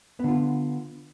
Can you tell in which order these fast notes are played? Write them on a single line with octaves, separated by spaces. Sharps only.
B3 D3 F4